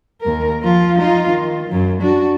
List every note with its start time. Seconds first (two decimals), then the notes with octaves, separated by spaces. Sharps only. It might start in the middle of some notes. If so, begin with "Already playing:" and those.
0.21 D#2 A#4
0.62 F3 F4
0.98 D#4 F4
1.29 D#3
1.68 F#2 F#3
2.01 D4 F#4